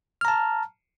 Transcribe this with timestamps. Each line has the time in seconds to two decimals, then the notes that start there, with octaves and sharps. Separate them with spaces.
0.21 F6
0.25 A#5
0.28 A5